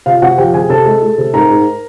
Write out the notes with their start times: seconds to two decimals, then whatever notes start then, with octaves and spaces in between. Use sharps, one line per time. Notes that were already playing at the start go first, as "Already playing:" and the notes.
0.06 C3 F4 F5
0.22 C3 F#4 F#5
0.38 F3 G4 G5
0.54 C3 G#4 G#5
0.70 C3 A4 A5
0.86 G#3
1.02 G#3
1.18 C3
1.33 G#2 A#4 A#5
1.50 G#2